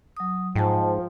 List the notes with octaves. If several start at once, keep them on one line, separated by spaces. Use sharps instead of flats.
F#3 D#6
G#2 F3 G5 A5